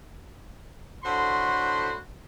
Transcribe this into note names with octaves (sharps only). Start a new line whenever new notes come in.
A2 D3 F#4 C5 B5 C6